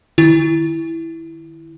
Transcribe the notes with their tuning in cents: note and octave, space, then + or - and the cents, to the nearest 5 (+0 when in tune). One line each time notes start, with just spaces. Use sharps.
D#3 -25 E4 +0